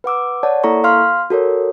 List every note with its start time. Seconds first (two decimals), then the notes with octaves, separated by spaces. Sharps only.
0.04 B4 F#5 D6 E6
0.43 C#5 D5 F#5 A5
0.64 A#3 E4 A4 A#5 C#6
0.84 F5 C6 F6
1.30 F#4 A4 A#4 C#5